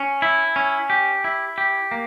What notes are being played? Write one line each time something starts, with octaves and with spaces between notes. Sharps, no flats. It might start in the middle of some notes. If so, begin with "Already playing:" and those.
Already playing: C#4
E4
C#4
G4
E4
G4
A#3